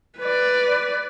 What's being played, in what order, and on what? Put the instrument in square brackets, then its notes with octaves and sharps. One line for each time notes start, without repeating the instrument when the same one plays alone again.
[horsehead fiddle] B4 D5